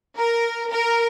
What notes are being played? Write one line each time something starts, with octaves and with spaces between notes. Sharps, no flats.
A#4
A#4